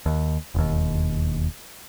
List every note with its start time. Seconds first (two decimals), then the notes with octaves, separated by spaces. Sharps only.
0.06 D#2
0.55 E1 D#2